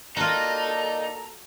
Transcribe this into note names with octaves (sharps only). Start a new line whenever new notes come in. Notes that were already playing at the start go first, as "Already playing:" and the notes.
A#3 D#4 F4 F#4 A4 D5 A#5